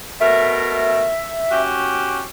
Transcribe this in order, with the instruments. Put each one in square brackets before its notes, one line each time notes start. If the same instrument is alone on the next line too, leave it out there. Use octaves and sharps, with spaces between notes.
[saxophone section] B2 A3 A#4 [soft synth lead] E5
[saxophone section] C#4 F#4 G4